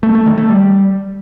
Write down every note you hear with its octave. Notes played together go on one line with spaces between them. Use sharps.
A3
A3
D#3
A3
G3